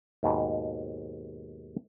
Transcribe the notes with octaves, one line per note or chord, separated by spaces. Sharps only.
D#2 G#2 B2